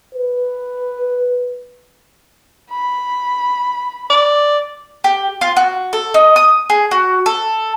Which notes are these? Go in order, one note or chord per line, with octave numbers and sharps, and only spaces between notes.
B4
B5
D5
G4
F4
F#4
A4
D#4
D#6
G#4
F#4
A4